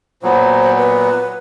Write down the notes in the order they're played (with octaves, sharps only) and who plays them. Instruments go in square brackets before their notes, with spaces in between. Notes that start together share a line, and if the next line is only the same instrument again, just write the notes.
[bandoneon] A#2 F#3 B3 [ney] C5
[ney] B4